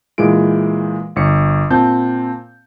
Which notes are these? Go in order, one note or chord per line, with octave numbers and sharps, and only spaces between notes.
A#2 E3 G#3 D7
G1 C#5 C#7
A#2 C4 A5 G6